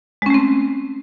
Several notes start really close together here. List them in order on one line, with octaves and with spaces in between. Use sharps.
G#3 C#4 A3 C4